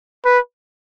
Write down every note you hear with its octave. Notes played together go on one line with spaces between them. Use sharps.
B4